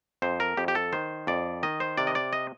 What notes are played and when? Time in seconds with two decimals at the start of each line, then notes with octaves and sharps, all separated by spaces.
0.22 F2 C5
0.40 A#4
0.57 F2 G4
0.68 G4
0.75 A4
0.92 D#3 C5
1.27 F2 D5
1.63 D#3 D#5
1.80 C5
1.97 C3 D5
2.07 D#5
2.15 D5
2.33 D#5